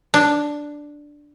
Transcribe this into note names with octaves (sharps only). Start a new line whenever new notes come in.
D4